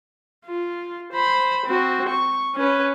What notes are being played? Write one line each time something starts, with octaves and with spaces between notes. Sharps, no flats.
F4
C5 B5
C4 F#4
C#6
C#4 B4